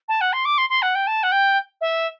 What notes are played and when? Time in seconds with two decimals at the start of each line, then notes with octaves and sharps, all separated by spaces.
0.08 A5
0.21 F#5
0.33 C6
0.45 D6
0.58 C6
0.70 C6
0.82 F#5
0.95 G5
1.07 A5
1.23 F#5
1.32 G5
1.81 E5